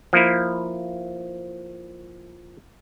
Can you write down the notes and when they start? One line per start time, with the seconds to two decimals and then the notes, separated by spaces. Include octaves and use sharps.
0.13 F3 A#3 E4